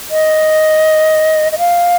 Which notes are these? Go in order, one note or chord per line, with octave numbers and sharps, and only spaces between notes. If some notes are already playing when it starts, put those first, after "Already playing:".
D#5
D#5
F5